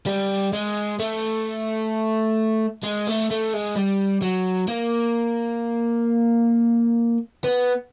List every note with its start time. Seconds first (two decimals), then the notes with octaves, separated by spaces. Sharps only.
0.07 G3
0.53 G#3
0.99 A3
2.83 G#3
3.07 A3
3.30 A3
3.53 G#3
3.76 G3
4.22 F#3
4.68 A#3
7.44 B3